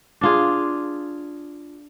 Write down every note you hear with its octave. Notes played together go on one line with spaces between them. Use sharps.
D4 F4 G#4